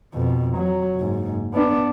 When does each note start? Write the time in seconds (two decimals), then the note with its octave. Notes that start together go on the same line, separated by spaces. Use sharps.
0.14 F2 B2
0.57 F#3
0.96 F#1 G#2
1.53 B3 D4